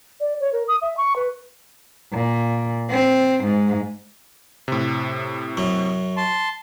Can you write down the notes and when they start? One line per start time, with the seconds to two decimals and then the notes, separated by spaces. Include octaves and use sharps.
0.20 D5
0.40 C#5
0.52 A#4
0.68 D#6
0.81 E5
0.97 C#6
1.16 B4
2.13 A#2
2.90 C4
3.45 G#2
4.68 A2 C3
5.57 F#2 F#3
6.17 A5 C6